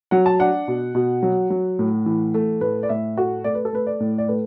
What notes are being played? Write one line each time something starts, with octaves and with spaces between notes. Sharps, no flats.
F#3 F#5
A5
D4 F#5
B2
B2
F#3
F#3
A2
E3
A3
A2 B4
D5
A2 E5
A3 F#4
A3 D5
B4
A4
A3 B4
D5
A2
D5
A3 B4